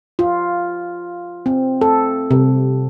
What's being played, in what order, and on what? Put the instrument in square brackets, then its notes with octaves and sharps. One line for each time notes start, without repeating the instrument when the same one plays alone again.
[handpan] F4
C4
A4
C3